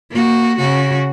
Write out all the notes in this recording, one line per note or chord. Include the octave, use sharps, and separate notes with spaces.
A#3 F#4
C#3 F#4